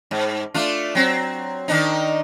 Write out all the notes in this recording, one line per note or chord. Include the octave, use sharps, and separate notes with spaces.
G#2
A3 D4 F4
F#3 C4
D#3 D4 D#4